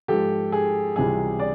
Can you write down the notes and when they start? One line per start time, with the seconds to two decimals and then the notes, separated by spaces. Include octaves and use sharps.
0.08 G#2 F3 G4 A4
0.52 G#4
0.96 C#2 C3 E3 G3 G#4
1.39 D5